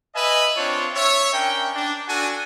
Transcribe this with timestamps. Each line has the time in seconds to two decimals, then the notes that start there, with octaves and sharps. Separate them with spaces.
0.15 B4 D#5 E5 G#5
0.57 C4 D4 F4 C#5
0.95 C#5 E5
1.34 C#4 D4 A#4 G5
1.75 D4
2.09 D4 F#4 A4 G#5